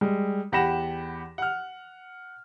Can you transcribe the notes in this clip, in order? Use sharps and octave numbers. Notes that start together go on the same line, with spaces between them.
G3 G#3
E2 G4 F#5 B5 A#6 E7
F#5 F6